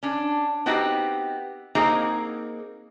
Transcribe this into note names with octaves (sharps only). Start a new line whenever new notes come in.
C#4 D4
B3 C4 D#4 F#4 G4
A#3 C4 D#4 F#4 G#4